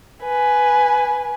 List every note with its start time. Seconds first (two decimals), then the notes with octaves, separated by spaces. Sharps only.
0.23 B4 G#5